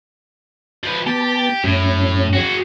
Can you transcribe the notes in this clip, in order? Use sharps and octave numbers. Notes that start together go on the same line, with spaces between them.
F3 B4
B3 G4 A5
F#2 A2 C#4
F#4 G#4